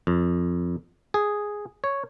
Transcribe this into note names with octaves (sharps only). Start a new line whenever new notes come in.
F2
G#4
C#5